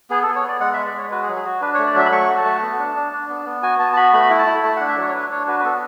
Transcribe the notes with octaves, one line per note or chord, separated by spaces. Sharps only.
B3 G#4
A4
B3
C#5
B3 D5
G#3 F#5
G#3 E5
D5
G#3 C#5
F#4 B4
G#4
F#3
G#4
F#4
D4 B4
C#5
A3
D5
F#3 E5
B5
A3 C#6
F#4
A5
A3
B3
D4
D4
D4
B3
B3
F#4 G#5
B3 A5
A5
F#4 B5
A3 B5
E4
A5
E4
A3 A5
D4 F#5
E5
F#3 C#5
C#5
D4 B4
D4 C#5
F#4 B4
B4
B3 A4